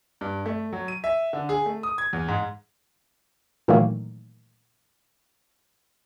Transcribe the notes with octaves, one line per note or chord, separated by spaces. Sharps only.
G2
A3
F#3
D#7
E5
D3
G#4
A3
D#6
G#6
E2
G#2
A#2 D#3 E3 F#3 A3 A#3